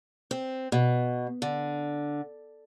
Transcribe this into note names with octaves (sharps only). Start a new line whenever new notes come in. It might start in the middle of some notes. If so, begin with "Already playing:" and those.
C4
B2
D3